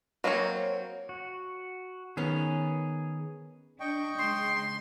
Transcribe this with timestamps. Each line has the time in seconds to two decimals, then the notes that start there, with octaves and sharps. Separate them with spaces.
0.24 F#3 A#3 C4 E4 C#5
1.09 F#4
2.17 D#3 B3 C#4 G#4
3.80 D4 D#5 G5 C#6
4.18 C#3 G#3 C6